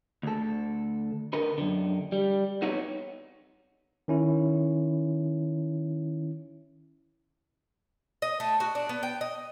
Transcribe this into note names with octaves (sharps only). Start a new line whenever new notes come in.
D2 A4
D3 A#4 B4
F#2 D3
G3
B3 C4 D#4 F#4 B4 C#5
D#3 C#4 E4
D#5
A3
F#4
D4
B3
G5
D#5